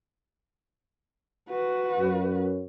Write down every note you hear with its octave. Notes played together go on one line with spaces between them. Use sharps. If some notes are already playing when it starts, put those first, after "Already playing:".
F#4 B4
F#2